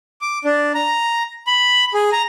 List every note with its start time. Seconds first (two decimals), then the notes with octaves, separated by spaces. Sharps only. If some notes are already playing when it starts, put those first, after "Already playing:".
0.21 D6
0.45 D4
0.75 A#5
1.47 B5
1.94 G#4
2.13 A#5